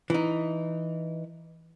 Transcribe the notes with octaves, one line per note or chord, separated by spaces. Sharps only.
E3 D#4